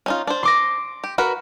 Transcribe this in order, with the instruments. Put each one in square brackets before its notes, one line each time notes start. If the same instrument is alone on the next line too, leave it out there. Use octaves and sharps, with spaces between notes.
[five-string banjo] C#4 D#4 F4
D4 C5
[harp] C6 D6 A#6
[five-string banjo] G4
F#4 A#4 B4